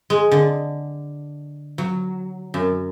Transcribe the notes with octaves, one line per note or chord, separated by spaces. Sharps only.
G#3
D3
F#3
F#2